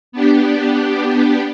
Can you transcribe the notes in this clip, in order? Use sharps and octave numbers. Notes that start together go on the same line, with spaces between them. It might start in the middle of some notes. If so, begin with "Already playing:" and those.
B3 D4 G4